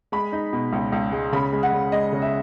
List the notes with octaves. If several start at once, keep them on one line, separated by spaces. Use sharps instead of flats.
G#3 B5
D#4
B2
C#2
C#2
G#3
C#3 B5
G#3
F#5
C#3
G#3 D#5
C#3
E5